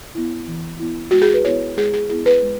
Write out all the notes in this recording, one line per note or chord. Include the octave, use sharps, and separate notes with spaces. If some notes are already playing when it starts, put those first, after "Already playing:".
B3 E4
E3
B3 E4
G#3 F#4
G#4
B4
B3 E4 C#5
G#3 G#4
G#4
B3 E4 G#4
B4
G#3